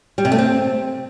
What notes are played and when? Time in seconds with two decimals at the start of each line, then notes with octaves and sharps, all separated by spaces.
0.18 G3
0.25 C3
0.32 A3
0.39 C4